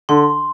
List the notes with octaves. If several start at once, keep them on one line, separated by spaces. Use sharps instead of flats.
D3 C6